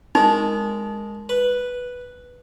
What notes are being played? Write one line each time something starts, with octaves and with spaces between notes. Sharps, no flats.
G#3 D#4 A#4
B4